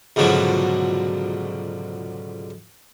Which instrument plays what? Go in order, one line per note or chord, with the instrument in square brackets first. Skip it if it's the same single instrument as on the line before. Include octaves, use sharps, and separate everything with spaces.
[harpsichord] C#2 G#2 B2 D3 F3 F#3